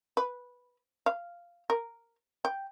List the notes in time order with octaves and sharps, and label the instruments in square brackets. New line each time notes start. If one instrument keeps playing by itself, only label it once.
[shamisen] B4
F5
A#4
G5